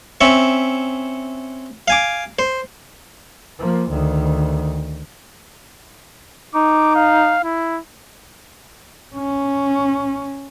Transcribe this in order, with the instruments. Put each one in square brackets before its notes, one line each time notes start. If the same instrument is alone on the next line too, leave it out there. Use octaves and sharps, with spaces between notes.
[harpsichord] C4 C#4 E5 C#6
F5 G#5 D6
C5
[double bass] F3 A#3
D2 D#3
[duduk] D#4 [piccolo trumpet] D6
[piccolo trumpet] F5
E4
[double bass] C#4